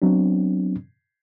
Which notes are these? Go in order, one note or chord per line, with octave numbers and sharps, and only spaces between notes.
F#3 B3 C4 D4